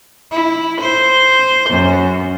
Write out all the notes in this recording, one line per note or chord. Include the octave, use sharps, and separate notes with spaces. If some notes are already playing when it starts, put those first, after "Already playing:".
E4
C5
F#2